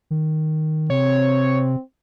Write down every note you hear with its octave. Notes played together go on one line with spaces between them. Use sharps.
D#3
C3 C4 C#5